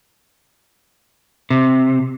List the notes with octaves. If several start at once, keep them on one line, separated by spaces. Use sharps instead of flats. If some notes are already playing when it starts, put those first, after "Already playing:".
C3